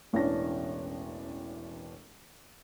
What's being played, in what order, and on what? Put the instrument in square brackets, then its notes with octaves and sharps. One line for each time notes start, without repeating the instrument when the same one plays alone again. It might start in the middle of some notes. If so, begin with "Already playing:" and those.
[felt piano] E1 A1 E3 C#4 D4 A#6